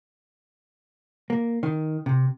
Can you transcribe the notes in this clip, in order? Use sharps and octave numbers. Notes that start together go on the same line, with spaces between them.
A#3
D#3
C3